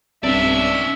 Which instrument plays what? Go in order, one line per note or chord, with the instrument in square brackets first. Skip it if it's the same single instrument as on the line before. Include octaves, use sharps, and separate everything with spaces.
[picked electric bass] B1 G2 [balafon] C4 [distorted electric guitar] C#4 D5 [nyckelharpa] E5